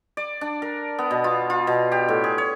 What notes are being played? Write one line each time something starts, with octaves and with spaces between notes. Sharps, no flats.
D5
D4
A#4
B3
B2
F4
F4
B2
G4
A2
G#4
C#5